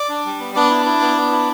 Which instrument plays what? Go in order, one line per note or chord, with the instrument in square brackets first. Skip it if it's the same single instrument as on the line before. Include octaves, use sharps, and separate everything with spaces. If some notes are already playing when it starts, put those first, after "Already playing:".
Already playing: [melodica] D5
D4
G3
B3
B3 D4 D5
E4
E4
B3
B3
E4